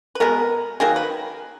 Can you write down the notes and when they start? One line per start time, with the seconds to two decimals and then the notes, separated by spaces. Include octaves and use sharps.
0.15 B4
0.20 B2 G#3 B3 A#4
0.80 D#3 F#3 A#3 G#4
0.96 B4